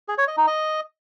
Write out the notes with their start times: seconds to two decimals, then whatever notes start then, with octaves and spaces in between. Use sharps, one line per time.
0.08 G#4
0.18 C#5
0.28 D#5
0.37 D#4
0.47 D#5